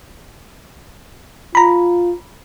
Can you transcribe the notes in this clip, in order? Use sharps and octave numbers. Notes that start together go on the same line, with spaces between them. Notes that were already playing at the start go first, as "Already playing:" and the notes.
F4 A#5 B5